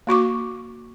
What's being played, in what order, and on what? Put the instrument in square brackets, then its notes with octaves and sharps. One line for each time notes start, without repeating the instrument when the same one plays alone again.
[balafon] A#3 F#4 C#6 D6